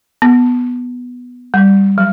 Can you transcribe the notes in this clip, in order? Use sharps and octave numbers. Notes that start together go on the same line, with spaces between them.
B3
G3
F#3